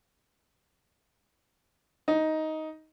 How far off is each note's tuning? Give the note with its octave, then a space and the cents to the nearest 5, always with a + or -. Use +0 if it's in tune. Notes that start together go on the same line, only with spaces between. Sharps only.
D#4 +10